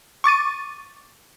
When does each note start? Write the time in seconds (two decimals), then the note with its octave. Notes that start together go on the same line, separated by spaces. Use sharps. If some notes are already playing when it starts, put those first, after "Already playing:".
0.24 C#6 D6 A6 D#7